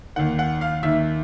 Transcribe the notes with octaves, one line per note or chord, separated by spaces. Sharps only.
D#2 D#3 F#5
F#5
F5
D#2 D#3 E5